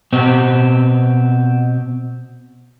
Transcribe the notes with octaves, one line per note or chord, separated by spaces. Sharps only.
B2 C4